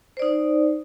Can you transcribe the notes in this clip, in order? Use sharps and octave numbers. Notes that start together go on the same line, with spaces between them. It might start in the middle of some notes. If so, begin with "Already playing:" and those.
D#4 C5 D5